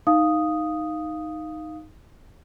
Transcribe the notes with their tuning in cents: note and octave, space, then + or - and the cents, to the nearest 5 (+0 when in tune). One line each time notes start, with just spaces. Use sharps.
D#4 +0 F5 +0 D#6 +0